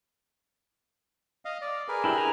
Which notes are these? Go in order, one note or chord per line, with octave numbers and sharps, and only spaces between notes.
D#5 F5
D5
G#4 A#4 B4
D4 E4 G4
G#5 A#5